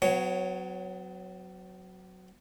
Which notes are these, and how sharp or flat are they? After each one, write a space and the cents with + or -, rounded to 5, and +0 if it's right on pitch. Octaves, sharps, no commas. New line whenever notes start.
F#3 +0 B3 +45 C#5 -5